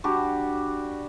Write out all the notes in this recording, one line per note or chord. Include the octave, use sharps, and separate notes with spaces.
G3 D4 F#4 G4